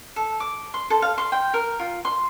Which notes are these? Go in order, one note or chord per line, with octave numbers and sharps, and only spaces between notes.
A4
D6
C6
A4
F5
C6
G5
A#4
F4
C6